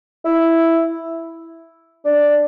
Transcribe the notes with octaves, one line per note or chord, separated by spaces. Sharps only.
E4
D4